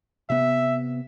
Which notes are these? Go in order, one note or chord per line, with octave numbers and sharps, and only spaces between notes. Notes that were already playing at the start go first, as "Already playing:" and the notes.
C3 B3 E5